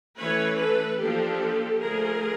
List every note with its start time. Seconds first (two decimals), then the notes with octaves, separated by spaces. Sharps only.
0.18 E3 A3 C#4 B4 C#5
0.58 A4 B4
0.99 F3 A#3 D4 G4 A4
1.80 D3 F3 A3 G#4 A#4